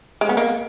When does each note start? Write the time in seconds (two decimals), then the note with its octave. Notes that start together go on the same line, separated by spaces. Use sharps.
0.21 G#3
0.29 B3
0.37 A#3